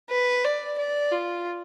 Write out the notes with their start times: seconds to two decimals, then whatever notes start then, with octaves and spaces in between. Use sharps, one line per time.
0.11 B4
0.45 D5
0.78 D5
1.12 F4